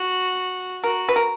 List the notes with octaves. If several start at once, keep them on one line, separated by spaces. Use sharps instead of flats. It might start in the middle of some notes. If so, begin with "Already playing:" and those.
Already playing: F#4
F#4 A#4
B4
A#4